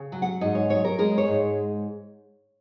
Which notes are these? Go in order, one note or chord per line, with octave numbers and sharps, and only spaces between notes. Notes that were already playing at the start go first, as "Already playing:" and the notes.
Already playing: C#3
F#3
F#5
G#2 D#5
C#5
F#3 C#5
A#4
G#3 A#4
C#5
G#2